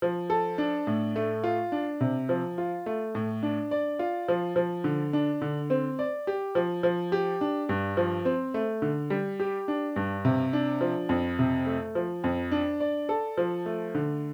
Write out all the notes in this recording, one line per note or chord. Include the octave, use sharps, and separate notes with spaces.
F3
A4
D4
A2
A3
F4
D4
C3
F3
F4
A3
A2
D4
D5
F4
F3
F3
D3
D4
D3
C4
D5
G4
F3
F3
G4
D4
G2
F3
C4
A3
D3
G3
G4
D4
G2
C3
D4
F3
F2
C3
A3
F3
F2
D4
D5
A4
F3
A3
D3